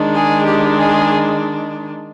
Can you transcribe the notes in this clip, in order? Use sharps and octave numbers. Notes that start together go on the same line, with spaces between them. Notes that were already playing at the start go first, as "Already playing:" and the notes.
Already playing: D#3 G#3 D4
G#4
G4
G#4